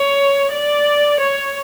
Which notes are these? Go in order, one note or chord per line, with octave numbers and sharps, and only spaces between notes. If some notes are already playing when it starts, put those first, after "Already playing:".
Already playing: C#5
D5
C#5